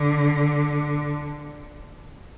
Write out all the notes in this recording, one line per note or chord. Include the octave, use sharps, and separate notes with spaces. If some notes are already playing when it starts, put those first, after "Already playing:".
Already playing: D3